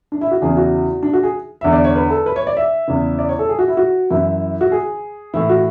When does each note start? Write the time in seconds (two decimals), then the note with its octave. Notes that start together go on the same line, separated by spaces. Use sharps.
0.12 D4
0.21 E4
0.31 F#4
0.42 E2 C#3 E3 G#4
0.57 F#4
1.03 D4
1.13 F#4
1.23 G#4
1.61 E2 D3 E5
1.72 D5
1.84 C#5
1.96 B4
2.10 A4
2.26 B4
2.36 C#5
2.47 D5
2.57 E5
2.88 E2 C#3 E3
3.19 D5
3.29 C#5
3.39 A4
3.49 G#4
3.59 F#4
3.68 E4
3.77 F#4
4.10 F#2 E3 E4
4.61 F#4
4.72 G#4
5.34 A2 E3 E4
5.49 F#4